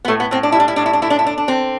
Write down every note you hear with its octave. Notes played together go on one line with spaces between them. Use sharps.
B3
A2 A3
B3
A2 C4
D4
G3 E4
D4
E4
A2 D4
E4
D4
D3 E4
D4
E4
D3 D4
D4
D3 C4